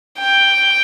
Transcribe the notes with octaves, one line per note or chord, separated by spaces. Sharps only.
G5